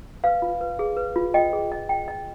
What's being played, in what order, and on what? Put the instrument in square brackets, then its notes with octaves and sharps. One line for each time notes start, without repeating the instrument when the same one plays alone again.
[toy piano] B4 [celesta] F5
[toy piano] F4
B4
G#4
B4
F4
[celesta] D#5 [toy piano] G5
[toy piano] G#4
D#5
G5
D#5